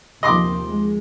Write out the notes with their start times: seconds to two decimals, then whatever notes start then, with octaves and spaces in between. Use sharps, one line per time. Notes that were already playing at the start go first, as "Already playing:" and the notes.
0.23 D#2 C3 F3 D#5 C6 D6
0.65 G#3